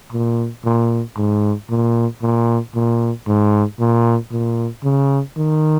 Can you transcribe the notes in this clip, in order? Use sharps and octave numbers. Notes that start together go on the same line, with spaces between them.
A#2
A#2
G#2
A#2
A#2
A#2
G#2
A#2
A#2
C#3
D#3